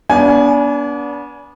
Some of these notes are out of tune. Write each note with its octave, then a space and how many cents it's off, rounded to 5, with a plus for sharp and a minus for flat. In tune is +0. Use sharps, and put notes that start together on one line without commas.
B3 -30 D4 -30 G#5 +10